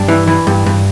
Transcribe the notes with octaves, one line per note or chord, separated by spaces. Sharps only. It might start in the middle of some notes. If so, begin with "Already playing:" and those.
Already playing: G2 D4
E3
E3
G2
G2